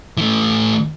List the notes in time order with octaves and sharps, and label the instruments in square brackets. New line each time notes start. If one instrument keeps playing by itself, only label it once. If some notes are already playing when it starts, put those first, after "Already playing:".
[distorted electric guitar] E3 A3